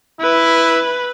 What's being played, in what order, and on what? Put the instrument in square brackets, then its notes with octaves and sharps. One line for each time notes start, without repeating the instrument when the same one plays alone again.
[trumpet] E4 [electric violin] B4